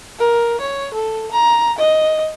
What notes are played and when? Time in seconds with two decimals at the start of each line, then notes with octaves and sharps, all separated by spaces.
0.19 A#4
0.61 C#5
0.94 A4
1.32 A#5
1.78 D#5